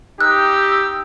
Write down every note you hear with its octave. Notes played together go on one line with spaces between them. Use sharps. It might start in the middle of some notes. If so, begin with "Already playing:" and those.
D#4 G4 E6 F#6